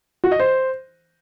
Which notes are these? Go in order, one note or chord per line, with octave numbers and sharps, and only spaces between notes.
F#4
D#5
C5